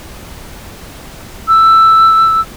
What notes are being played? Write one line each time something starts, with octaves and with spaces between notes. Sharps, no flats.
E6